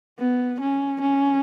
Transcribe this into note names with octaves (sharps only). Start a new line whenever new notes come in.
B3
C#4
C#4